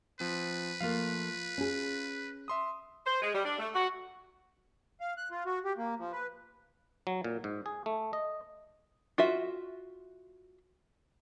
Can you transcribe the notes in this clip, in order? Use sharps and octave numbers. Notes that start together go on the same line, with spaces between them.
F3 C4 B4
F3 A3 A#3 F4 F5
C#4 G#4
E5 C6 D#6
C5
G#3
G3
D4
A3
F#4
F5
F#6
F4
F#4
G4
A#3
F3
B4
F#3
A#2
G#2
G#4
A3
D#5
F4 F#4 E5